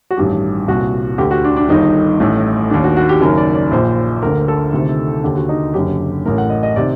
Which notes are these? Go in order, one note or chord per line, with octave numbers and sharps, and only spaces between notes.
F#4
A1 G2 D#3 G4
C2 A#2 F#4
D2 D3 G4
F#4
D4
D4
G1 G2 D#3 D#4
A1 A2
D#2 D#3 D4
F#4
F#4
G4
F#1 F#2 D#3 A#4
D5
D5
A#1 A#2 C5
D2 D3 A#4
A4
D2 C3 D#3
D#2 D3 G4
F#4
D#4
F#1 F#2 D3 G4
A1 A2 A#4
F#5
D#5
D#5
C3 D#3 D5